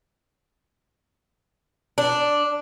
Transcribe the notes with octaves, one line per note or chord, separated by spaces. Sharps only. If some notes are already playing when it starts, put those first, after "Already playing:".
D4